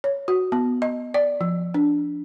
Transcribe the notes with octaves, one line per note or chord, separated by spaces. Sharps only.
C#5
F#4
B3
D#5
D5
F3
D4